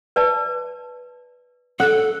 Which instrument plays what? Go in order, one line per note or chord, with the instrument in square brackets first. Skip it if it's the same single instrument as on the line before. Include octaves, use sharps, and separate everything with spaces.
[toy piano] B4 D5 A5
[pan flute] A4 [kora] F#5